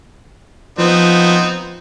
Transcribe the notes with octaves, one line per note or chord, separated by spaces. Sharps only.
F3 B3 C4 D#4